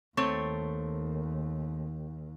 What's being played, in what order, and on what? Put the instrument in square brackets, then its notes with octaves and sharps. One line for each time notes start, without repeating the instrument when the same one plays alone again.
[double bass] D#2 [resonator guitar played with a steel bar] A3 C4 C#5